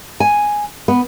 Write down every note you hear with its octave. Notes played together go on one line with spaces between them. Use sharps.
G#5
B3